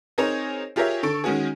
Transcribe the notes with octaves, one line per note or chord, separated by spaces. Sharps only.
C4 D#4 G#4 A#4 C5 C#5
F4 G4 G#4 A#4 C#5 E5
D3 A4 C#6 D7
D#3 G#3 C#4 F#4 G#4